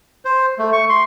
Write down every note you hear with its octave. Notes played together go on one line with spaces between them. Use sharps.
C5
A3
C#6
C6